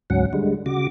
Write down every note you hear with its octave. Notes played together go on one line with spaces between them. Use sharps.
D2 G#2 F#3 C#4 F#5
D3 G3 G#3
C#3 F#4 D6